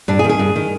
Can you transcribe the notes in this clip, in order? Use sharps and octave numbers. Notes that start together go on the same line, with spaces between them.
G2 D4
G#4
D#3
G#4
G2
D#3